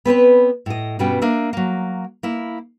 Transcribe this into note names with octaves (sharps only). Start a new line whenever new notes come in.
B3 C4 B4 C#5
A2 D#5
G2 B2 G3 B3 C#4 G5
A#3 D4 E5
F#3 A#3
A#3 E4